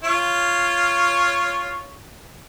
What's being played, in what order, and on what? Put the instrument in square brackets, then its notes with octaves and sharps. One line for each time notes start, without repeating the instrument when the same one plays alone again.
[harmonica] F4 C#5